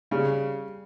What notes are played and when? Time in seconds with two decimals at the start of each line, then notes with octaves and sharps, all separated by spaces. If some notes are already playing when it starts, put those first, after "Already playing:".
0.11 C#3 G3